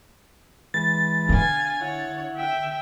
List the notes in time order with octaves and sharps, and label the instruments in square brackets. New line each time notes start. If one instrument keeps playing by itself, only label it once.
[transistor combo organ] E3 G#3 B4 [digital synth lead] A6
[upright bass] D3 [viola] F5 G#5
[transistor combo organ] E4 F#5 [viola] C#5
[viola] E5 G5